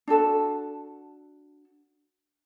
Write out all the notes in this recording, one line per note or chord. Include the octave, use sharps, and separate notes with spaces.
D4 F#4 A4 A5